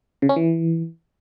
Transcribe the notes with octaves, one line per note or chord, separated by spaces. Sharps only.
C#3
C#4
E3